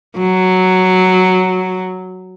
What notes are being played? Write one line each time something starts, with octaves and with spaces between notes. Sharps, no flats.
F#3